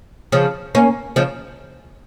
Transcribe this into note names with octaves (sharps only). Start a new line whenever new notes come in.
C#3 F3
A#3 C#4
C#3 F3